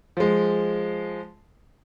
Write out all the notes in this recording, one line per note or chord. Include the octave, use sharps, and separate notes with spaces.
F3 G#3